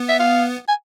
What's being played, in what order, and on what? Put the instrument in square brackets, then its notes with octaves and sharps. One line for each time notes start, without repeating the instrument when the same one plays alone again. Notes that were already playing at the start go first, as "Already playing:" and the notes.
Already playing: [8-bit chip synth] B3
[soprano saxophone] E5
F5
G#5